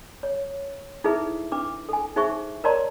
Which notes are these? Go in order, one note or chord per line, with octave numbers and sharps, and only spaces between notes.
C#5
D#4 E4 G#4 A4 B4 E5
D4 B4 D6
A4 G#5
D#4 G#4 C5 E5 C#6
A#4 C#5 D5 A5 A#5 C6